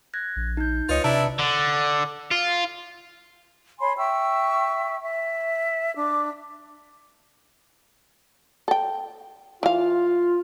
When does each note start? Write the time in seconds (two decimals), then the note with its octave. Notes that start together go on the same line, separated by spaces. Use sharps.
0.14 F#6 G#6 A#6
0.36 A#1
0.57 D#4 G6
0.89 C#2 F4 B4 C#5 D#5
1.04 C3 D4 E4 D5 A5 A#5
1.39 D3
2.31 F4
3.80 C#5 G#5 B5 C6
3.97 E5 G5 C#6 E6
5.01 E5
5.97 D4 D6
8.68 A4 G5
9.63 E3 F4 F5